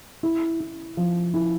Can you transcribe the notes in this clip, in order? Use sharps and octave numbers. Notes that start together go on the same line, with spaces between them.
E4
E4
F3
E4